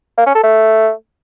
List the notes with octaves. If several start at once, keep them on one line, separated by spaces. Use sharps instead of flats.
A#3
C#4
A4
A3